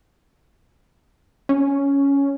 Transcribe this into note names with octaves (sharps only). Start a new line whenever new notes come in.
C#4